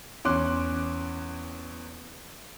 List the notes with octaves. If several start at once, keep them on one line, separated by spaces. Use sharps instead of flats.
E2 C#4 C6 D6 F#6